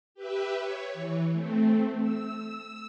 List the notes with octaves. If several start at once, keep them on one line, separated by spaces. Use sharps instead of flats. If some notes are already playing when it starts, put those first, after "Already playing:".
G4 B4 E5
C#5
E3
A3 C4
E6